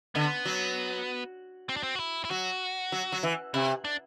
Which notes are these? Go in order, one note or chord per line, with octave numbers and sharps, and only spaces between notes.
D3 B3
F#3
C4
D4
C4
F#4
E4
E4
F#3 F#4
F#3
F#3
E3
C3 E4
D4